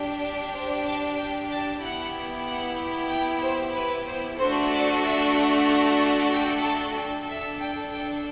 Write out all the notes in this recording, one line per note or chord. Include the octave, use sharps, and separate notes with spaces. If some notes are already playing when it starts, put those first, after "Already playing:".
Already playing: D4 G4
C5
A5
G5
A5
B3 E4 G4 F#5
F#5
G5
C5
B4
C5
A3 D4 F#4 A4 C5
D5
E5
G5
A5
D4 A4 G5
E5
G5
G5